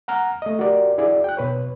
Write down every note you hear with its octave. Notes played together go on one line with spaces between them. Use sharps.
F#5 A#5 F6
A3 D#5
F#4 G4 A#4 D5
E4 F#4 G#4 D5
G5 F#6
B2 B4 C#5